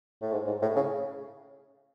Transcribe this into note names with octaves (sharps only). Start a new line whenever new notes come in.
A2
G#2
G#2
A2
C#3